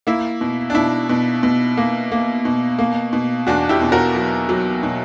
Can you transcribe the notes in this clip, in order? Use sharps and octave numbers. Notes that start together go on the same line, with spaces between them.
A#3 E4
B2
D4
B2 E4
B2
B2
A#3
A#3
B2
A#3
B2
E2 D4 F#4
E4 G4
B2
F#4 A#4
F#3
F#3
B2